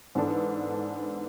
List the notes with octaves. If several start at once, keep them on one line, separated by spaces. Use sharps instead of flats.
G#2 E3 B3 D4 A4